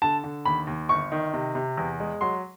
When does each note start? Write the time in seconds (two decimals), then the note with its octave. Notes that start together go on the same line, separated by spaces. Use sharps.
0.02 D3 A5
0.24 D3
0.45 D#2 B5
0.67 D#2
0.89 G1 C#6
1.12 D#3
1.34 C3
1.55 C3
1.77 E2
2.00 G#3
2.21 F#3 C6